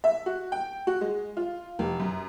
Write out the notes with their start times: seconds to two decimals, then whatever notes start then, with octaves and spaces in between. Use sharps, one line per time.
0.04 E5
0.26 F#4
0.52 G5
0.87 F#4
1.01 G#3
1.37 F4
1.79 F1
2.00 F#2